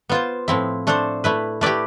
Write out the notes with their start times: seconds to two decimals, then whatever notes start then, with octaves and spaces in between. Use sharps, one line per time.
0.09 B3 F4 C5
0.48 A2 F3 C4 E4
0.87 A3 D4 A4 C5
1.24 A3 E4 B4
1.61 A3 E4 G4 B4 D5